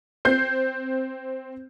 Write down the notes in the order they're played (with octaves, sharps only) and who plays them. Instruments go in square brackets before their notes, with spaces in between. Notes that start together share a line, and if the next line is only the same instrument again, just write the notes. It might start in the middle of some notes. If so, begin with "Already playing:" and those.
[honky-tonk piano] C4 G6 C7